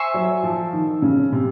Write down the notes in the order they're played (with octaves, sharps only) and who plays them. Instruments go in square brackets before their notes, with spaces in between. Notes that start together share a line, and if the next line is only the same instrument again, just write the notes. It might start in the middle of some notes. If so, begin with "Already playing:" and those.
Already playing: [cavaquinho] C5 E5 G#5 C#6
[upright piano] F#3
F3
D#3
C#3
C3